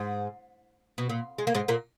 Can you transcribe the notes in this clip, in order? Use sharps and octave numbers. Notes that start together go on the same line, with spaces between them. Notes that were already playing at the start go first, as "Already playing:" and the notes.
Already playing: G#2
B2
A#2
G#3
A#3
G#2 G#3
A#2 A#3